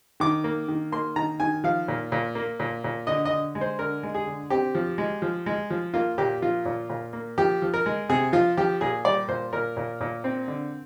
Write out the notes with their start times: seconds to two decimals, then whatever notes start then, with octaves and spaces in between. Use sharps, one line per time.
0.20 D#3 D6
0.44 A#3
0.68 D#3
0.92 A#3 C6
1.16 D#3 A#5
1.40 D#3 G#5
1.64 F3 F5
1.88 A#2
2.12 A#2
2.35 A#3
2.59 A#2
2.84 A#2
3.07 D3 D#5
3.25 D#5
3.31 D3
3.55 G#3
3.61 C5
3.79 D3 A#4
4.03 G#3
4.15 G#4
4.27 D3
4.50 C4 G4
4.75 F3
4.98 G#3
5.22 F3
5.46 G#3
5.70 F3
5.94 A#3 F4
6.18 A#2 G4
6.42 F3 F4
6.65 A#2
6.90 A#2
7.13 A#3
7.38 F3 G4
7.62 F3
7.74 A#4
7.86 G#3
8.09 C3 G#4
8.33 F3 F4
8.57 F3 G4
8.81 A#2 G#4
9.05 G3 D5
9.28 A#2 C5
9.53 A#2 A#4
9.77 A#2
10.01 A#2
10.24 C4
10.48 D3